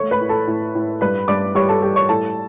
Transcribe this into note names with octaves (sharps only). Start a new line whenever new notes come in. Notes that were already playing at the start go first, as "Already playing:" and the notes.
Already playing: A3 C#5 C#6
B4 B5
A2
A4 A5
A2
A2
G2 B4 B5
G2 D5 D6
G3 C#5 C#6
A4 A5
G3 G4 G5
C#5 C#6
A2 A4 A5